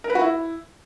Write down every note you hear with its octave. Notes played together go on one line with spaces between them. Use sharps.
A#4
B4
F#4
E4